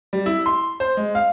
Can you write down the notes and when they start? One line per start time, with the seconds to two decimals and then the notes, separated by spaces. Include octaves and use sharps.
0.13 G3
0.26 E4
0.46 C6
0.80 C5
0.97 G#3
1.15 F5